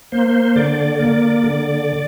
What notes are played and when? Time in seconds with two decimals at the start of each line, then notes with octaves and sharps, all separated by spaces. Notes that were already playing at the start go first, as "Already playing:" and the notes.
0.12 A#3 C5
0.56 D3 D5
0.99 A#3 D5
1.44 D3